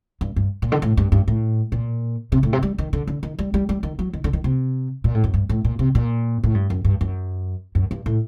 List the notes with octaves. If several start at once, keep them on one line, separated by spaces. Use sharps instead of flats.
G2
G2
A#2
D3
A2
G2
G2
A2
A#2
C3
A2
C3
G3
D#3
D3
D3
D#3
G3
G3
G3
D#3
F#3
D#3
D3
D#3
C3
A#2
A2
F#2
G2
A2
A#2
C3
A#2
A2
G2
F#2
G2
F#2
F#2
G2
A2